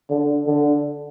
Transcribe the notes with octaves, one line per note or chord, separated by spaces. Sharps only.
D3
D3